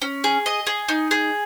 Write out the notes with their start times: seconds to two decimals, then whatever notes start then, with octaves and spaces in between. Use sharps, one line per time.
0.02 C#4
0.24 G#4
0.46 D#5
0.67 G#4
0.89 D#4
1.11 G#4